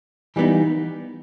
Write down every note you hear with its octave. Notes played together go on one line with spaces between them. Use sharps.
E3 G3 B3 D#4